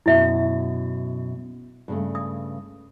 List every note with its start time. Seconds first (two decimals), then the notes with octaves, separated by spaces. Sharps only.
0.06 F#2 B2 E4 E5
1.88 G2 C#3 A3
2.15 D#6